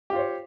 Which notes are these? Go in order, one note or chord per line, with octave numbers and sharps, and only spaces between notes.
F4 G4 C5 C#5